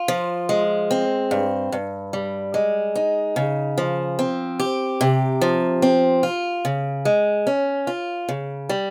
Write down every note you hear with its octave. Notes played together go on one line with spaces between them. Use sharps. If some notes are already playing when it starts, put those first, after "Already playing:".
Already playing: F4
F3
G#3
C4
G2
G2
G3
G#3
D#4
C#3
F3
C4
G4
C3
F3
C4
F4
C#3
G#3
C#4
F4
C#3
G3